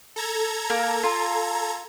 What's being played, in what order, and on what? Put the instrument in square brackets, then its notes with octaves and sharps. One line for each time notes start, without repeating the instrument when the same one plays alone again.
[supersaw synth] A4 A#5 G#6
[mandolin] A#3
F4